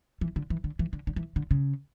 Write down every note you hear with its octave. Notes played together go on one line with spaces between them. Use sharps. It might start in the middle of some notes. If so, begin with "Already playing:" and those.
E3
D3
E3
D3
E3
D3
D3
E3
D3
C#3